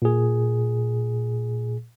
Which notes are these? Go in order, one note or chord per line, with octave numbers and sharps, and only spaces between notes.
A#2 G#4